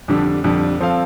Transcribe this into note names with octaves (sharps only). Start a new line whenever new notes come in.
F2 D3 G3 D4
F2 D3 G3 D4
F3 C4 A4 F5